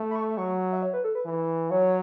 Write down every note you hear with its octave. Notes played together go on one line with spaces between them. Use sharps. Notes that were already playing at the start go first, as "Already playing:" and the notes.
Already playing: A3
B5
C#6
F#3 C#6
E5
C#5
B4
A4
B4
E3
F#3 C#5